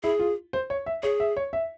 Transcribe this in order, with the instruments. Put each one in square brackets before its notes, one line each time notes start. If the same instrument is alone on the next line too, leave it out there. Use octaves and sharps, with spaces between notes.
[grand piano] E4 [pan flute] G#4
[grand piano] F4
C5
C#5
E5
[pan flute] G#4 [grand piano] C#5
[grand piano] E5
C#5
E5